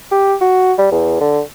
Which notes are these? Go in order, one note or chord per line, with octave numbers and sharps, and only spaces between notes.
G4
F#4
G3
E2
D3